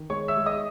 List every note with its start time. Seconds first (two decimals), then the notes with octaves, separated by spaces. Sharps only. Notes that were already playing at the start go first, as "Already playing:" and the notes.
Already playing: D#3
0.10 G#3 C#5 C#6
0.28 E5 E6
0.37 G#3
0.46 D#5 D#6